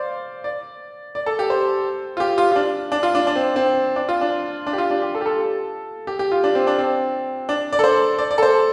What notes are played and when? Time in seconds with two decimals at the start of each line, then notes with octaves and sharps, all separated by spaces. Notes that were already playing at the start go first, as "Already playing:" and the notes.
Already playing: C5 D5 F5
0.44 D5
1.15 D5
1.26 A4
1.39 G4
1.50 C5
2.17 F4
2.20 G4
2.38 F4
2.52 F4
2.56 D4
2.92 D4
3.03 F4
3.15 D4
3.27 D4
3.36 C4
3.56 C4
3.96 D4
4.09 F4
4.21 D4
4.67 D4
4.73 G4
4.78 F4
4.91 D4
5.02 G4
5.15 A4
5.21 G4
5.26 A4
6.07 G4
6.19 G4
6.32 F4
6.44 D4
6.55 C4
6.67 D4
6.78 C4
7.49 D4
7.73 D5
7.79 A4
7.84 C5
8.18 D5
8.31 D5
8.38 A4
8.42 C5